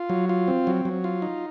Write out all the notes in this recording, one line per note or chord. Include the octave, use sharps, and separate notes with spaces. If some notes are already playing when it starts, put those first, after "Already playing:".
Already playing: F4
F#3
F4
C4
F#3
F#3
F4
D#4